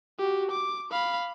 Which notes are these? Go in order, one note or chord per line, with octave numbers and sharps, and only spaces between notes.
F#4 G4
D6
F5 B5